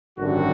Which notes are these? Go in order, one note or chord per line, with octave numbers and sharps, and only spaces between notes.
G#1 F#2 D3 G3 F#4